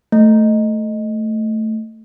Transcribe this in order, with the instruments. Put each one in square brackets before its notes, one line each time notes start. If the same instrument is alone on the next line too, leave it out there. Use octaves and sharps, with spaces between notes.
[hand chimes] A3